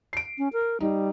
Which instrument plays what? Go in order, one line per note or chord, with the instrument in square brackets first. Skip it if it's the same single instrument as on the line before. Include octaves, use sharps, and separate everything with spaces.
[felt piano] C7 D7
[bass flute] C#4
A#4
[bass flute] G3 [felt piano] D#4